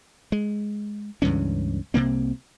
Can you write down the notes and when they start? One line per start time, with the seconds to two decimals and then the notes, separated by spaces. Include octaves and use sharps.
0.32 G#3
1.22 C#2 G2 E3 C#4
1.94 C2 C3 A#3 C4